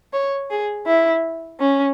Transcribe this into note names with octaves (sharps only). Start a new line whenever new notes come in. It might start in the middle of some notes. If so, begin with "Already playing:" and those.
C#5
G#4
E4
C#4